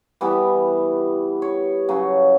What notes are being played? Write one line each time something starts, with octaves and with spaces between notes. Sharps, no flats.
E3 G3 B3 G4
C#5
C#3 F#3